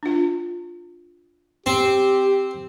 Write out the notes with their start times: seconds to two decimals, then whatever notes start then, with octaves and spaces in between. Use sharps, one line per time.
0.03 D4 F4
1.66 C4 G4